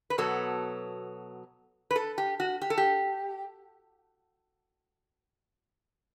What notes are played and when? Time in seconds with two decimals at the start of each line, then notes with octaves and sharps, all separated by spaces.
0.10 B4
0.18 B2 F#3 B3 A4
1.91 B4
1.96 A4
2.18 G4
2.40 F#4
2.62 G4
2.70 A4
2.78 G4